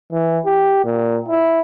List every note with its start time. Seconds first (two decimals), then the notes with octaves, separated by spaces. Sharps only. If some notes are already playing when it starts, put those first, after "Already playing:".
0.12 E3
0.46 G4
0.84 A#2
1.28 E4